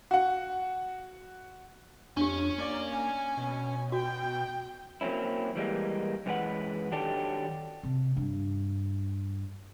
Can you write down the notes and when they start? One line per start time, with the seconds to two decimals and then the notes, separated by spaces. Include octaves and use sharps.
0.11 F#4 F#5
2.17 F2 C#4 D4 G4
2.58 A#3 D5
2.92 G#5
3.37 B2
3.92 F#4 G5
5.01 F#3 A#3 C4 C#4 E4
5.56 E3 G3 G#3 A#3
6.26 F#2 E3 G#3 G4 B4 F#5
6.92 D#3 F#3 D4 G4 A4
7.83 C3
8.16 G2